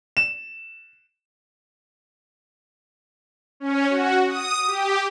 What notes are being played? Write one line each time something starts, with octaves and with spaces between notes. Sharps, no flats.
E7
C#4
F#4
D#6
G4